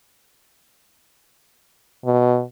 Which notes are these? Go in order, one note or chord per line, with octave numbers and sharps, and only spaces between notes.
B2